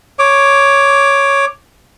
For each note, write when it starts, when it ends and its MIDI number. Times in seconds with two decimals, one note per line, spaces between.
0.19 1.45 73
0.19 1.45 86